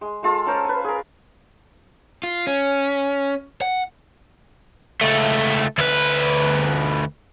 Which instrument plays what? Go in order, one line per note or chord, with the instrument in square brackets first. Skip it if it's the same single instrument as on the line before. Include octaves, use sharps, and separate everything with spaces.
[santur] G#3
G#3 F4 A4
C#4 A4 A#4 C5
B4 G#5
G#4 A#4
[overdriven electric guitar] F4
C#4
F#5
C#2 A3
D2 B4